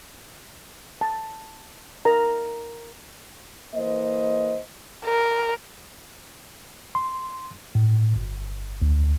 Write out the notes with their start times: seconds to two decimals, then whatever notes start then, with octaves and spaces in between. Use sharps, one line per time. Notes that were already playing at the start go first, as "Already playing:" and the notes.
1.01 A5
2.05 A#4 A#5
3.75 E3 A#3 C5 D#5
5.06 A#4
6.95 C6
7.75 A2
8.16 G1
8.82 D2